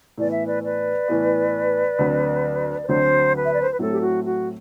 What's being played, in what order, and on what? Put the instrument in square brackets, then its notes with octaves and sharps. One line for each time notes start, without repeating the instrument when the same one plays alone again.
[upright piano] A2 E3 B3 [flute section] D5
[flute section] E5
B4 D5
B4 D5
[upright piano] A2 E3 B3
D2 D3 F#3 C4
[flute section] B4
[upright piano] D2 D3 F#3 C4 [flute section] C5
[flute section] B4
E5
D5
C5
B4
[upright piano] A2 F#3 A3 C4 [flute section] A4
[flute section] G4
F#4
F#4